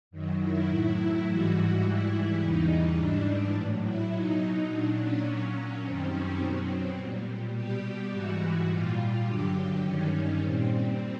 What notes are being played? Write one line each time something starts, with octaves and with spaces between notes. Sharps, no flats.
F#2 D#3 F#3
E4
A2 F#3 E4
G#2 E3 G3 F#4
G#2 E3 G3 E4
E2 C#3 E3 G3 D#4
G#2 E3 G3 D4
A2 F#3
E4
B2 F#3 D#4
A#2 F#3 D4
C#4
A#2 F#3 C#4
F#2 D#3 G3 C4
C#4
B2 F#3 C4
A#2 G3
B2 G3 G4
G#2 E3 G3 F#4
A#2 G3 F4
F4
G2 D3 F#3 G4
G2 D#3 G3 C#4
A#2 G3 C4